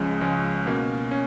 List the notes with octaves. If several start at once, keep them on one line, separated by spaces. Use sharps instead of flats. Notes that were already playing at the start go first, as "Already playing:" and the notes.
Already playing: C#2 C#3 F3 G#3 C#4
C#2 C#3 F3 G#3 C#4
B2 A#3 C#4
C#4